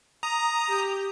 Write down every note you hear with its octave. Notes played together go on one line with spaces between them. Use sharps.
A#5 D#6
G4